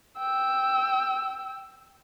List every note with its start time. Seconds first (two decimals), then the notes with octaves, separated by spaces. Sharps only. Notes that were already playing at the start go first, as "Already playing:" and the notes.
0.18 G5 E6